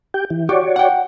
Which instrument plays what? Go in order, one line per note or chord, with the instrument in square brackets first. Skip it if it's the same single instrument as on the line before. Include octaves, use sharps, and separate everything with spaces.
[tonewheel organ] G4 G5
E3
[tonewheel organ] F#4 C#5 D5 [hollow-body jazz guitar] G4
[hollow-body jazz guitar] F#5 G5